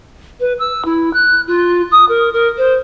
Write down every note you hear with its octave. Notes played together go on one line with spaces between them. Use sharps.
B4
E6
E4
F#6
F4
D#6
A#4
A#4
C5